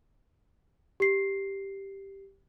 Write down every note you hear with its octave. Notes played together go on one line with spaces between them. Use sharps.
G4 C7